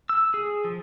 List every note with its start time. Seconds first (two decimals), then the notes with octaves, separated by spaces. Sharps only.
0.09 E6
0.34 G#4
0.64 F3